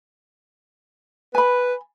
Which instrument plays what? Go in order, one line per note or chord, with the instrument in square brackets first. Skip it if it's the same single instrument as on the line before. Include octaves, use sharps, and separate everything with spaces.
[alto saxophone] B4 [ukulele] G#5 B5